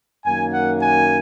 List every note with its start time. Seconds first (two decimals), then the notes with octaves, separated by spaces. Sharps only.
0.25 F#2 D#3 A#3 G#5
0.54 F#5
0.82 G#5